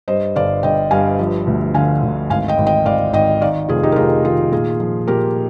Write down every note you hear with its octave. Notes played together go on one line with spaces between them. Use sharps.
G2 C5 D#5
G1 D5 F5
G1 D#5 G5
G2 F5 G#5
F3
D2
D3 F5 G#5
D2
G#1 F5 G#5
D#5 G5
G#1
D#5 G5
G#1 D5 F5
G#1 D#5 G5
D#3 D5 F5
F1 F4 G#4
D#4 G4
A#4
F1 F4 G#4
D#3 F4 G#4
A#2 F4 G#4
F3
A#2 G4 A#4